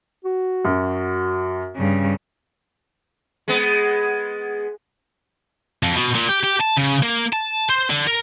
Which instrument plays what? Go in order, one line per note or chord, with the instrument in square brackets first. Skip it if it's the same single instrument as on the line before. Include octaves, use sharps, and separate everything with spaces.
[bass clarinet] F#4
[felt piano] F#2
[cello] G2 C#3
[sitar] G#3 B3
[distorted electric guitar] F2
B2
A#2
G4
G4
A5
C#3
A#3
A5
C5
D3
A#4